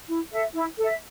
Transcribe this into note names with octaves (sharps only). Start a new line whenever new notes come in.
E4
A4 E5
E4
A4 E5